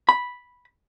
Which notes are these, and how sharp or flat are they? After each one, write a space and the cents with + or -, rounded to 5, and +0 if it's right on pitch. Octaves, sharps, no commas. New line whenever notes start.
B5 -5